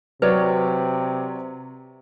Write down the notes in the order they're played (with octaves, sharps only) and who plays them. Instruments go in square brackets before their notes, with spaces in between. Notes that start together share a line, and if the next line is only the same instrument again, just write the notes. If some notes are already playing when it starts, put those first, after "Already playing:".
[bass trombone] C3 [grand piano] F#3 C#5 D5 [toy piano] B4